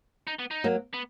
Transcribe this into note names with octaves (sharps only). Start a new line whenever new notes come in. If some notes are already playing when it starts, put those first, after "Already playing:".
D#4
B3
D#4
F#3 A#3
B3